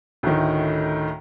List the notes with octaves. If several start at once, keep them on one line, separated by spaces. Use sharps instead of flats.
D2 A2 D#3